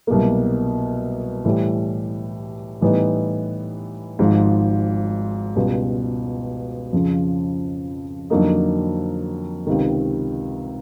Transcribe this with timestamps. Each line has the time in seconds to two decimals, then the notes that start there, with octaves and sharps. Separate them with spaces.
0.07 C2 B2 F#3 A#3
1.45 A2 E3 G3
2.81 A2 E3 G3 B3 D#4
4.19 G#1 G#2 F3
5.55 C#2 B2 G3
6.93 F2 C#3 F3
8.30 F2 D3 F#3 A#3 D#4
9.67 C#2 C3 D#3